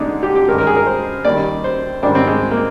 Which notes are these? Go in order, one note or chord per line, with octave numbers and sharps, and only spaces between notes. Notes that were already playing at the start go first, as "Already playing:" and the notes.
Already playing: D#2 D3 G#3 D4 D#4
G4
G4
G2 D#3 G#3 A#4
A#4
G#4
A#4
C5
D#2 D#3 G3 D5
C5
G#2 D#3 G3 D4
C4
G#3
A#3